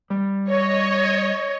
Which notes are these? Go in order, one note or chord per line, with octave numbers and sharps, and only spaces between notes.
G3
C#5 D#5